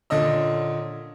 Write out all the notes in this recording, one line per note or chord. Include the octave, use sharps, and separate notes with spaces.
A#2 D3 C#4 D#5 E6